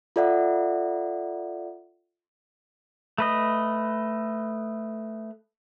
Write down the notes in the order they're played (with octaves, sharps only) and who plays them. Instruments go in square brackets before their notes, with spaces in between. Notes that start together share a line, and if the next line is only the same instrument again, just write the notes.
[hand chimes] F4 A4 D5 E5 F#5
[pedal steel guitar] A3 B4 D#5